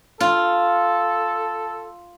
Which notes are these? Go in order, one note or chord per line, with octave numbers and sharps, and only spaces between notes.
F4 A4